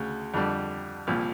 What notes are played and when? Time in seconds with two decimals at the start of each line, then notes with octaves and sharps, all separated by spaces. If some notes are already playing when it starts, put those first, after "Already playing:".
Already playing: D2 C#3
0.34 F2 D3 G3
1.07 C2 A#2 F3